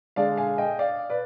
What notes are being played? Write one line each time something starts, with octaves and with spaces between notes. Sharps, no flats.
D3 G#3 D4 D5 F5
F5 G#5
D#5 G5
D5 F5
B4 D5